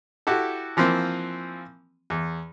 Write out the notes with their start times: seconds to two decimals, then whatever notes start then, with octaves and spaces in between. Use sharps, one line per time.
0.27 E4 F#4 G4 A4
0.77 E3 F3 A#3 C4
2.10 E2